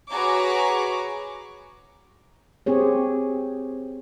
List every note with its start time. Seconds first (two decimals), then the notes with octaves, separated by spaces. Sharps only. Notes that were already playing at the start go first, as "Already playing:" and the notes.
0.10 F#4 G#4 B4 C#5 A#5 D6
2.66 C4 G4 G#4 C#5